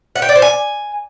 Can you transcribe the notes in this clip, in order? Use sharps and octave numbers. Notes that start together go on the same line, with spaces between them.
F#5
G5
D5
C5
G#5